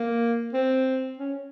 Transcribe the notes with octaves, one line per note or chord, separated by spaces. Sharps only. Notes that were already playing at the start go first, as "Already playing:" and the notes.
Already playing: A#3
C4
C#4